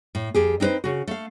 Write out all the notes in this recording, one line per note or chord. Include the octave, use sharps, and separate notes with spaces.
A2
F2 G4 G#4
C4 D#4 F4 B4 C5
C#3 F#4
A3 F5